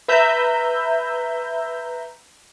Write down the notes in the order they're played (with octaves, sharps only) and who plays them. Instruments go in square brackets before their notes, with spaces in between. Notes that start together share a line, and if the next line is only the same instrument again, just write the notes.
[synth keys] B4 E5 A#5 G6